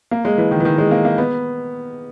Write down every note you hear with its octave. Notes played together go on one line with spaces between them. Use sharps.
A#3
G#3
E3
D#3
E3
D#3
G#3
A#3
A#3
B3